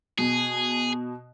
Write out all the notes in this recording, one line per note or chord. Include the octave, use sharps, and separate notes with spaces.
B2 G#4